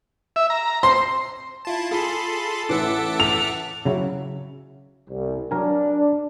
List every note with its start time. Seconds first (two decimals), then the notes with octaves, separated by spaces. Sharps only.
0.36 E5
0.50 A#5
0.83 C5 C6
1.65 E4 F4 A5
1.91 F4 G#4 A4 B5 C6
2.69 A1 B4 E5 F#5 D6
3.20 F7
3.85 C#3 F#3 E4
5.09 C2
5.51 F#3 D4 A#4 G#5